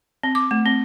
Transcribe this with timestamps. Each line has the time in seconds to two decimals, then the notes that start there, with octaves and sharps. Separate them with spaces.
0.23 C4
0.35 D6
0.51 A3
0.66 C4